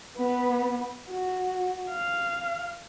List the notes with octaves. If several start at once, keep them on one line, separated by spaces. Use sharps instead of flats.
B3 B4
F#4
F5